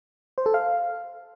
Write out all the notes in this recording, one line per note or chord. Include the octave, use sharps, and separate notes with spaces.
C5
A4
F5